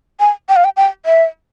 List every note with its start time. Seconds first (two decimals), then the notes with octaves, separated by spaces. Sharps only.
0.20 G#5
0.49 G5
0.56 F5
0.64 G5
0.77 G5
1.06 E5